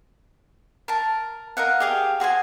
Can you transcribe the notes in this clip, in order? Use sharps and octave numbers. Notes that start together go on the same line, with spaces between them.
A#4 A5
A#4 D#5 F5 F#5
G4 G#4 F5
F#4 G#4 C5 G#5